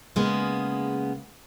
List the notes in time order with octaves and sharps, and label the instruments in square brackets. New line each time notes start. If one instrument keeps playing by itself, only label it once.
[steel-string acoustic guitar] C#3 G#3 A#3 B3